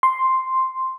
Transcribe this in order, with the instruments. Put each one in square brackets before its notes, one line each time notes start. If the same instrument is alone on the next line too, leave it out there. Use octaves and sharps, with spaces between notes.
[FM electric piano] C6